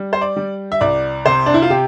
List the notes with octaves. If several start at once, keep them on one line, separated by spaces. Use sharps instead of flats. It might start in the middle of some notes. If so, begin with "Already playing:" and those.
Already playing: G3
C5
D5
G3
E5
C2 D5
C3 C5
D4
E4
F4
C3 G4